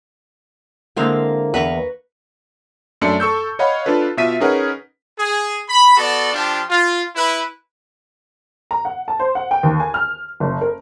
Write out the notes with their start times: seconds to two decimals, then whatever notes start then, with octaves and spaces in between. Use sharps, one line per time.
0.97 D3 G#3 A#3 C4 E4 F5
1.54 E2 B4 A#5 C#6
3.01 F#2 A3 D4 D5 C#7
3.20 A4 C#6 E6 G6
3.59 C#5 D#5 F5 F#5 B5
3.86 D4 F4 A4 B4
4.17 B2 F4 E5 B6 D#7
4.40 C#4 D#4 G#4 A#4 B4 F#5
5.18 G#4
5.68 B5
5.96 B3 F#4 A4 D5
6.32 F3 D4 F4 G4
6.69 F4
7.15 E4 B4
8.71 A#5
8.85 F#5
9.08 A5
9.20 C5
9.35 F#5
9.51 G5
9.63 D#2
9.80 G#5
9.94 F6
10.40 F#1
10.61 A#4